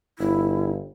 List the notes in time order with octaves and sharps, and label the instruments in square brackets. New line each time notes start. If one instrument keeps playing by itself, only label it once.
[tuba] G1 [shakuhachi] E4